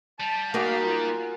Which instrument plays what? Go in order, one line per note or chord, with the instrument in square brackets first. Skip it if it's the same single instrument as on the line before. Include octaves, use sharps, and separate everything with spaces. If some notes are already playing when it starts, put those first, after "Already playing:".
[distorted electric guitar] G3 [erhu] A5
[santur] G#3 F#4 A#4 [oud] A#3 D#4 D5 [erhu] F5
[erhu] F4